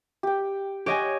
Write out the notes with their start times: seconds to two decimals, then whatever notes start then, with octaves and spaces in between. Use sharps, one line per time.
0.23 G4 G5
0.86 G4 C#5 D#5 F#5 G#5 C#6